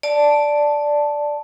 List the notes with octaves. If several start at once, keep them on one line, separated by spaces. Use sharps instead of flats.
D5 A5